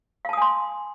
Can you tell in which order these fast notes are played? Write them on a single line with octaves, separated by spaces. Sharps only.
F5 A5 D#6 G#5 C6